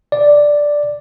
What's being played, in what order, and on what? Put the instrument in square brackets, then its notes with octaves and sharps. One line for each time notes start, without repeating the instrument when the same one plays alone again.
[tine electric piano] D5